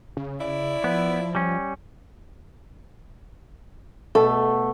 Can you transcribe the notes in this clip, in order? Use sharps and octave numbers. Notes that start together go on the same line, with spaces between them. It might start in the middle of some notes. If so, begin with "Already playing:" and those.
C#3
E4 D5
F3 B3
G3 C#4
B2 A3 A4